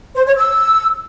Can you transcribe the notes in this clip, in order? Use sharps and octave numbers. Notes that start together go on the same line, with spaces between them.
C5
C#5
E6